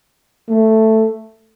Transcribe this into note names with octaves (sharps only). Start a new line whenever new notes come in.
A3